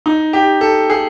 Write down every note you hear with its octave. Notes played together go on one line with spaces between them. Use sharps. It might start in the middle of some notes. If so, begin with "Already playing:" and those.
D#4
G4
A4
G#4